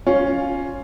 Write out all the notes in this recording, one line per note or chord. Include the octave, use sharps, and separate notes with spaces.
C#4 F4